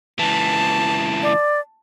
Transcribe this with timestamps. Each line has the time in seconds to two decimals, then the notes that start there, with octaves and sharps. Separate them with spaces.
0.19 C#2 E3 A5
1.23 D5